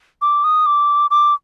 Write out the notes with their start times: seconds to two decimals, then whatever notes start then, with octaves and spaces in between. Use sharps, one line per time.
0.22 D6
0.44 D#6
0.66 D6
1.11 D6